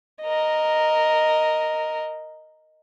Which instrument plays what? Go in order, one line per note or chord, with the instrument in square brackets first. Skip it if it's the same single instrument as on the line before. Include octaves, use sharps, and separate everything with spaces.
[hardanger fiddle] A#4 D#5